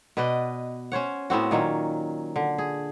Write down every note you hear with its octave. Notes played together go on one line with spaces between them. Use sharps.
B2 B4 D5 D#5
C#4 C5 C#5 F#5
A2 B3 C4 F#4
A#2 D#3 F#3 C#4
D3
G#4